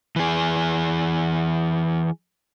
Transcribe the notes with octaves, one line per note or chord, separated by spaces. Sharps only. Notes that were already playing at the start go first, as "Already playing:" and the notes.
E3 G#4